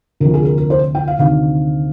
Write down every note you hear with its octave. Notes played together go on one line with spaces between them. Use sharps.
D2 C3 F3 A#4
G#4
A#4
A#4
C5
G5
F5
D2 C3 D#3 F5